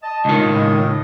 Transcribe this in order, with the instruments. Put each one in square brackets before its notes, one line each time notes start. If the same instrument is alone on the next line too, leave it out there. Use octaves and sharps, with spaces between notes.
[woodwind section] D#5 A5
[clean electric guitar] C#2 D#3 [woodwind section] G#3 C#4 F4
[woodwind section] A2 D#5